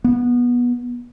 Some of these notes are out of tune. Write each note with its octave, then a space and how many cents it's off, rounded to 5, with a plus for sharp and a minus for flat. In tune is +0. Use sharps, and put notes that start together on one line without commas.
B3 -20